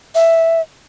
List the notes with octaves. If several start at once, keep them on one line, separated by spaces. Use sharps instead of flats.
E5